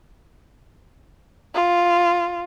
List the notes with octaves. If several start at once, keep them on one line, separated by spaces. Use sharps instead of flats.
F4